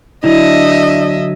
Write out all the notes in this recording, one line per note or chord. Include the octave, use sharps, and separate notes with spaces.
D3 F#3 D4 E4 D#5 E5